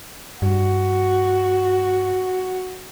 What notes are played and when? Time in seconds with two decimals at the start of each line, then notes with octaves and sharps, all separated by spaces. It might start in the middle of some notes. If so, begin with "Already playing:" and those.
0.42 G2 F#4